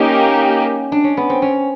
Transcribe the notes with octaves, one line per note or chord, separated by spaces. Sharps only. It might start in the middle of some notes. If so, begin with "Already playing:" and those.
Already playing: A#3 C#4 D#4 G4 A#4
D4
C#4
B3
C4
C#4